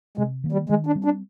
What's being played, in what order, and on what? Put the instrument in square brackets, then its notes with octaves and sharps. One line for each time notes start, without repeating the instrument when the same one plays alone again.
[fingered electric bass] C3 [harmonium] G#3
[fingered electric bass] D#3 A#3
[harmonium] G3
[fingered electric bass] D#3 [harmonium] G#3
[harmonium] D4
[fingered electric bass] G3 C4
[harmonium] D4